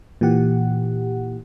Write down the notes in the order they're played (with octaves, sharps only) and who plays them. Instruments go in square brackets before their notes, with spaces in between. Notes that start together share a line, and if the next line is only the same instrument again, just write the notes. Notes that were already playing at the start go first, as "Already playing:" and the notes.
[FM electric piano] A#2 E3 G4 F#5